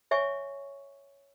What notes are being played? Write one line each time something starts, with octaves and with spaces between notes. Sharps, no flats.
C#5 E5 G#5 C#6